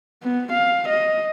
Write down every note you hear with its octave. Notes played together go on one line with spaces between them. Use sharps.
B3
F5
D#5